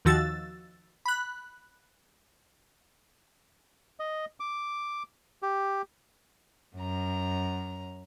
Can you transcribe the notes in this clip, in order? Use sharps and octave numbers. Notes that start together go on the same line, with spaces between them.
D#2 D#3 F3 F#4 E6 A6
B5 F#6
D#5
D6
G4
F#2 A#5